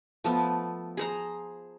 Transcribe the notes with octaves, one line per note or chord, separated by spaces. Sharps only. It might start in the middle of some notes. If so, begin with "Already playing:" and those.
F3 A3 B3
G#4 C5 A#5